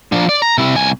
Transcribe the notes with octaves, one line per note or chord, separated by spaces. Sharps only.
F3 D4
D5
A#5
C3 E4
C2 G#5